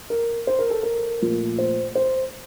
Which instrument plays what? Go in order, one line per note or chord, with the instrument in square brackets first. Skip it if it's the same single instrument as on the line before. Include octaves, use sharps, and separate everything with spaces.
[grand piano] A#4
C5
A#4
A4
A#4
A#2 F3 A3
C5
C5